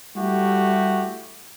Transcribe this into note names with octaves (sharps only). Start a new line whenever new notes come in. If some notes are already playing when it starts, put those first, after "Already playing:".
G3 A3 E4 F#4 G4